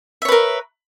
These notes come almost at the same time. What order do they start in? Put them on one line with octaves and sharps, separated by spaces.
E5 C#5 B4 A#4